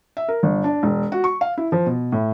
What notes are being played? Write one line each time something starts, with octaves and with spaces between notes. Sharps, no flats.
E5
A#4
G1
D4
E1
F#4
C#6
F5
E4
F3
B2
A2